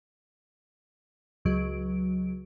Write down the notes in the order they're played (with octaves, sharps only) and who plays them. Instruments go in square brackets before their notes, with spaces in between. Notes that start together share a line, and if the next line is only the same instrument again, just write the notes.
[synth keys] C#2 F#3 D7